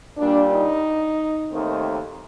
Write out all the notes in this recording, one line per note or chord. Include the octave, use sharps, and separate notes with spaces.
A#2 G3 A#3 D4
D#4
D#2 D#3 A3 C4